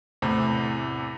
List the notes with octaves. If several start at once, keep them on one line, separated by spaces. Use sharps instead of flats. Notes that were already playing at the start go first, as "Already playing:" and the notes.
E2 A2 C3